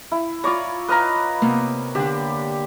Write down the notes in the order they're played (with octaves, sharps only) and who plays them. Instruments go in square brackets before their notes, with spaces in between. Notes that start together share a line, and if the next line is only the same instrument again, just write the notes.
[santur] E4
[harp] F4 A#5 [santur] C#5 D5
[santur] B4 F5 A#5 [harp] D#5
[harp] C3 A#3 B3
[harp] D3 D4 [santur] G4